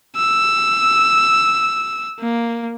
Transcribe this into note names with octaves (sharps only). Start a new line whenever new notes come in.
E6
A#3